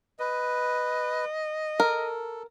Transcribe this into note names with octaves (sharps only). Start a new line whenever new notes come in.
B4 D#5
A4 A#4